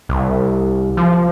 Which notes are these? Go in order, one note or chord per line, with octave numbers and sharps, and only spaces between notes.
C2
F3